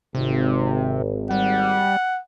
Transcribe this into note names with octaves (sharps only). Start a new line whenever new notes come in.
G#1 C3
G3 F#5